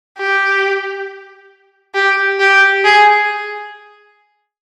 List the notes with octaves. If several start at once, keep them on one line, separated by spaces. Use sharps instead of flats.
G4
G4
G4
G#4